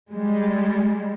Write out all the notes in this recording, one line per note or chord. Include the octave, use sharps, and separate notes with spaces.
G3 G#3